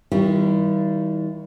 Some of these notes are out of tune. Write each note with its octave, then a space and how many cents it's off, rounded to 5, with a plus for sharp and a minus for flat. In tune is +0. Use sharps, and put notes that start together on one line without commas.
D#3 +40 G3 -10 F4 -45